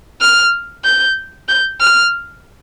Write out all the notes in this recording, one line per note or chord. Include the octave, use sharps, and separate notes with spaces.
F6
G6
G6
F6